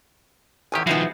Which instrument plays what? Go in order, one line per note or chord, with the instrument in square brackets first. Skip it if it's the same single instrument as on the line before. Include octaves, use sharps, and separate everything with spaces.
[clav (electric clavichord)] A1 D#3 G4 [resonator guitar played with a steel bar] E2 G#5
[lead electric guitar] D#3 F3 [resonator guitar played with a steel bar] B3 D#4 E4 [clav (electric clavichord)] F#4 G#4 F5